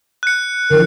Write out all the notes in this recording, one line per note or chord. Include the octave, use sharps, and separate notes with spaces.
F#6 C#7
D3 E3 F3 A#4